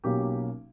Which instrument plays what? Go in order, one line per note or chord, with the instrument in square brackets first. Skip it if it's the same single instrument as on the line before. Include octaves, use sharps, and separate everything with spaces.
[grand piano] B1 B2 F#3 A#3 C#4 G4